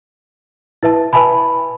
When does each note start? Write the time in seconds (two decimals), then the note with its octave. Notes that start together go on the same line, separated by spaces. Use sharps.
0.83 E4 B4 E5 A5
1.13 B4 E5 G#5 A5 B5